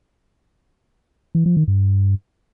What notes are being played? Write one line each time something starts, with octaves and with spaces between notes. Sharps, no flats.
E3
F3
D#3
G2